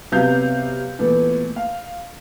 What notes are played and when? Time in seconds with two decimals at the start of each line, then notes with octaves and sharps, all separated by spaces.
0.12 C3 F#3 B3 F5 G6
0.99 A#2 E3 A3 B3
1.56 F5